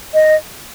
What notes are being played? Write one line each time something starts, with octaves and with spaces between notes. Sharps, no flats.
D#5